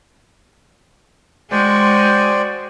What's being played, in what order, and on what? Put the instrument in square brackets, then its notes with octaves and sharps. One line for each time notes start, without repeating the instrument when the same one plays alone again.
[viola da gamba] G#3 F#4 G#4 [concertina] C5 D5 G5